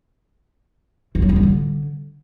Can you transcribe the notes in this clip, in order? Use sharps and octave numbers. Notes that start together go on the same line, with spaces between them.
E3
F#3
B3
G3
D3